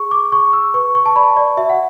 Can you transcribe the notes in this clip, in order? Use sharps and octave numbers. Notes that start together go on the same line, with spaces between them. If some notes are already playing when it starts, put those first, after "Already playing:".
Already playing: G#4 C#6
D6
G#4 C#6
E6
B4 C#6
C#6
A5
D5 B5
D5
F#4 E5
F#5